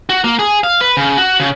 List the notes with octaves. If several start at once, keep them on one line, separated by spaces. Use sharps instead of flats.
F#4
A#3
G#4
F5
B4
C#3
F#4
C#3